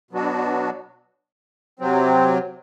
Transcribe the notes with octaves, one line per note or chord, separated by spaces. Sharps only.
B2 F#3 B3 D4 F#4
C3 F#3 C4